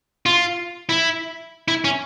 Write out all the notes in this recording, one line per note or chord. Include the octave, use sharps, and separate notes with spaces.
F4
E4
E4
C#4